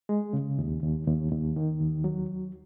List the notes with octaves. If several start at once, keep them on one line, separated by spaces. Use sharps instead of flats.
G#3
C#3
D#2
D#2
D#2
D#2
D#3
D#2
F#3